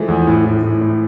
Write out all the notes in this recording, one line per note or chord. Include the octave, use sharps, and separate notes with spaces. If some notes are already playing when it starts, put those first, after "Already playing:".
Already playing: E3 F3 G#3 A3
E2
A2
A2
A2
A2